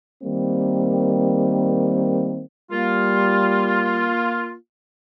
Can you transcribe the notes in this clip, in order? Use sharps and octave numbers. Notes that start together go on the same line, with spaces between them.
D#3 G3 A#3 C4
G3 A#3 F4